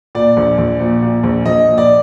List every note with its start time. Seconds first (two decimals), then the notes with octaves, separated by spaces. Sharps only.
0.15 A#2 D5
0.37 A#1
0.58 A#1
0.80 A#2
1.02 A#2
1.23 A#1
1.45 A#1 D#5
1.67 A#2
1.78 D5